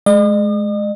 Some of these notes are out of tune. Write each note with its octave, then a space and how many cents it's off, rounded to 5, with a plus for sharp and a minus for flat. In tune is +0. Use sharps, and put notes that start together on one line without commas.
G#3 +25 D#5 -45